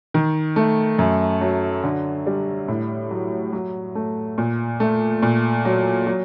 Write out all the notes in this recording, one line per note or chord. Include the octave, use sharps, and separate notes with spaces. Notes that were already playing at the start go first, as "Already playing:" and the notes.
D#3
A3
F#2
F#3
D3
G3
A2
F#3
F#3
A3
A#2
A3
A#2
F#3
F#3